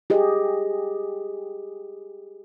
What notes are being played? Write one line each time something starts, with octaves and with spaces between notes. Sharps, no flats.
G4 G#4 D#5